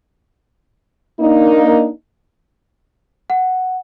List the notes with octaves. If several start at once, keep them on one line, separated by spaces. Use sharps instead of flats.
A#3 D4 D#4
F#5